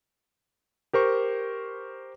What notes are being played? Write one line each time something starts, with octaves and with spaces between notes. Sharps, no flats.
G4 A#4 C5 C#6